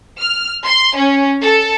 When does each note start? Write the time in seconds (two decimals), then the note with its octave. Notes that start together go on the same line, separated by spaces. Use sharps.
0.19 F6
0.66 C6
0.96 C#4
1.43 A4